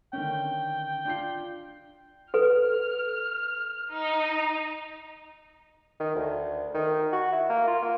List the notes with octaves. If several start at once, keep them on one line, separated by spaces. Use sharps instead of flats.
D3 D#3 C#4 G5
D4 F4 C7
A4 B4 F6
D#4
D#3
D2
D#3
F#4
E4
A#3
F4
A#3